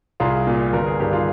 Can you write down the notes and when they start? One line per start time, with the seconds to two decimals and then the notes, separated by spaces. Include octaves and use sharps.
0.20 C2 F4 G#4
0.47 A#2
0.73 G1 A#4
0.86 G#4
1.00 G2 D#3 G4
1.13 F4 G#4